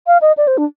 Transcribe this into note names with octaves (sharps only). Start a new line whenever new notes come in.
F5
D#5
D5
C5
D4